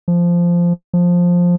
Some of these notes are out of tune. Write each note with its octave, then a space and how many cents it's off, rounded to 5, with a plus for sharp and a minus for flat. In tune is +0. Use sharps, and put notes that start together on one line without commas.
F3 -10
F3 +10